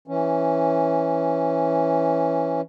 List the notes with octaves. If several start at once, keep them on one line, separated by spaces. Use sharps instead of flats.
E3 C#4